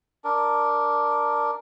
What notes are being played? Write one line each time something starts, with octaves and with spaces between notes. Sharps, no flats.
D4 A#4